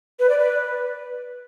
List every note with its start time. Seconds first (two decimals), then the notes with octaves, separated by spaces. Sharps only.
0.19 B4
0.29 D5
0.39 B4